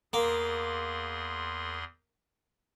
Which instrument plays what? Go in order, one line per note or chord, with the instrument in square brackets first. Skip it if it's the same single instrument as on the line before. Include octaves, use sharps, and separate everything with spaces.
[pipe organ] E2 G#4 C6 [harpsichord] A#3